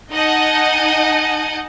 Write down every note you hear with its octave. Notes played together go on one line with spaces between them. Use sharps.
D#4 D#5 F#5 G#5 A5